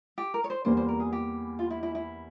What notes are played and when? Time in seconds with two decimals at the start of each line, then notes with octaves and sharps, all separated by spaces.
0.18 G4
0.34 A#4
0.44 C#5
0.50 C5
0.65 E2 E3 G3 A#3 C5
0.77 C5
0.89 A#4
1.00 G#4
1.13 G4
1.59 F4
1.71 E4
1.83 E4
1.95 E4